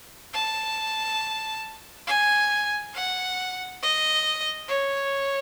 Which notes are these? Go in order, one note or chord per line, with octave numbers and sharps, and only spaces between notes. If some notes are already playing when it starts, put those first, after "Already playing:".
A5
G#5
F#5
D#5
C#5